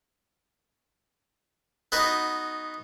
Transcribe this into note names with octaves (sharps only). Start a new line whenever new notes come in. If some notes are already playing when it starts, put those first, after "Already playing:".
B3 D#4 F#4 B4